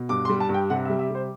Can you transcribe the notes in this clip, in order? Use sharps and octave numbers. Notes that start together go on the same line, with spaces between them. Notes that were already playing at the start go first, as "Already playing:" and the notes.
Already playing: B2
G2 D6
C6
G3
A5
G2 G5
C3 F#5
E5
G3
E5
C3 C5